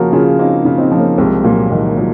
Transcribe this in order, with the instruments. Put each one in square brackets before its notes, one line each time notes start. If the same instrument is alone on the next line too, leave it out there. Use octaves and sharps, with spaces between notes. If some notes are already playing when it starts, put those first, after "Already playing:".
Already playing: [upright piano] C#3 F3 [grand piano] A#3 C#4 F#4 A#4
[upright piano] C#3 [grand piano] F4 G#4
[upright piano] A#3 [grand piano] C4 D#4
[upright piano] C#3
[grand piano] C4 D#4
[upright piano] F3
[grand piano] A#3 C#4
[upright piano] C2 [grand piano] G#3 C4
[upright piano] A#2 [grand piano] F#3 A#3
[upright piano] C2 [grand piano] D#3
[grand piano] F3 [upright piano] F#3